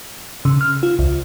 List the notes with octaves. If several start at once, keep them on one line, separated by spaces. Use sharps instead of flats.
C#3
F6
F4
C#2